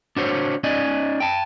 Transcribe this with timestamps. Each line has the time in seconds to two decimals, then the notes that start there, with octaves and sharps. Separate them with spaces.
0.17 D4 F#4 C5 C#5
0.64 C#4 D#4 D5 D#5 G#5
1.20 G5 A5